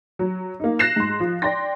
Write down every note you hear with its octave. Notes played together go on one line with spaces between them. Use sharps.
F#3
A#3 D#4
F#6 A#6 C7 E7
G#2 C6
F3
D5 G5 C6 A#6